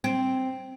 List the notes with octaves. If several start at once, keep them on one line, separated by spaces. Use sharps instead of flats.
C4